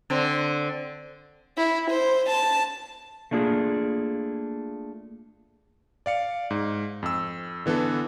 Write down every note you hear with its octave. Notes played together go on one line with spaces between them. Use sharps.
D3 C4
E4
C5
A5
A3 A#3 D4 F4 G#4
D5 F5 C#7
G#2
F2 E6
D3 E3 B3 D4 A4